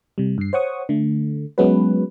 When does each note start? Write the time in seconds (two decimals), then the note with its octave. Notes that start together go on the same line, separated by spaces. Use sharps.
0.18 C3 G3
0.38 G2 C7
0.53 C5 C#5 F#5 C#6 D#6
0.89 D3 A3
1.58 F#3 G#3 B3 C#4 F#4 B4